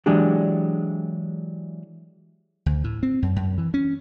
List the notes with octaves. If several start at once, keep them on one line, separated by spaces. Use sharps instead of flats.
E3 F#3 G#3 D4 G4
D2
A2
C4
F#2
F#2
E3
C#4